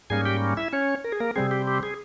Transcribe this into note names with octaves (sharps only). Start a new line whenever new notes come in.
G#2 G3 A#3 C#4 G#4 G#5
G4 G5
E4 E5
C#4 C#5
A#4
G#4
A#3 A#4
C3 G3 C4 G#4
G4
G4
G#4